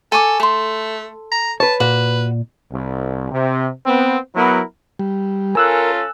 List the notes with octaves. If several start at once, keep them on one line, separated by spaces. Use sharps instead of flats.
A4 G#5 C#6 D6
A3 A4 C6
A#5
B4 C#5 A5
A#2 F#4 B4
C2
C3
B3 C4
F#3 B3 E4 A#4
G3
C#4 F4 A4 A#4 G#5 E6 F#6